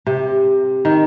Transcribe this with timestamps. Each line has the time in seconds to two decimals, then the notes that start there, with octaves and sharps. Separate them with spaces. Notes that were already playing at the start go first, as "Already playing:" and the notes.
0.06 C3
0.85 D#3